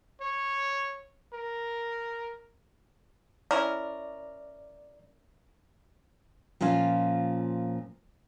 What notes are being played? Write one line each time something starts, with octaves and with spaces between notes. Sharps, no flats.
C#5
A#4
C#4 E4 A#4 D5
A#2 F3 C#4 F4